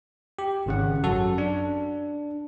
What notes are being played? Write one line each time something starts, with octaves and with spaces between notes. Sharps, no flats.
G4
G#1 C#3 F#5
F#2 F#4 A4
D4